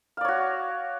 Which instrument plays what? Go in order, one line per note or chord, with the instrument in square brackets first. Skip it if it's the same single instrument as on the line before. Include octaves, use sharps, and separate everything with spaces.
[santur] F5
D5
C#5
F#4